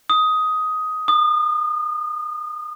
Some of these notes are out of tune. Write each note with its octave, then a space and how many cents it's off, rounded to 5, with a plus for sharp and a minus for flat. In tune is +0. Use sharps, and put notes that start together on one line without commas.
D#6 +10
D#6 -35